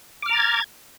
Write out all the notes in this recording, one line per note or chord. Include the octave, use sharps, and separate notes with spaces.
A#5 D6 F6 G#6 A6